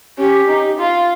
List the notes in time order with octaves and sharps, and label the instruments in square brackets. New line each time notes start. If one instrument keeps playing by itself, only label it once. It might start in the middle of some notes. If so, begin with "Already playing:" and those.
[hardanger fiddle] C#4 [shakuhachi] G4
[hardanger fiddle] D#4
F4